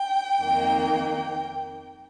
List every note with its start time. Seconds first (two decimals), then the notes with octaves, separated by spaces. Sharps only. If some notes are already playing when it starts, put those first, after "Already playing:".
Already playing: G5
0.41 F2 D#3 A#3